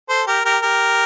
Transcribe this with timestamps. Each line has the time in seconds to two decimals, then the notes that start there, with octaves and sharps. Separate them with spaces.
0.09 A4 C5
0.27 G4 A#4
0.45 G4 A#4
0.63 G4 A#4